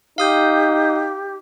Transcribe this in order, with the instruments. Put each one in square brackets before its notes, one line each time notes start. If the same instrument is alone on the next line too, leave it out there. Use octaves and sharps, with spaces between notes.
[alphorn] D#4 [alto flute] G4 [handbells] F5 D#6 G6